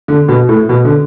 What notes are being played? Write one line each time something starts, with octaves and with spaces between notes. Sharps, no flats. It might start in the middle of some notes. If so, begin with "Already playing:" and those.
D3
B2
A2
B2
D3